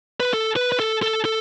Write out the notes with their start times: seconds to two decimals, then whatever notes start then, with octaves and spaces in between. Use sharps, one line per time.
0.20 B4
0.33 A4
0.56 B4
0.72 B4
0.80 A4
1.03 A4
1.25 A4